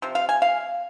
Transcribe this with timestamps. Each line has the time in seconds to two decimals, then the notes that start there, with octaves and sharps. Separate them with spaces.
0.02 C3 F3
0.15 F5
0.29 G#5
0.42 F5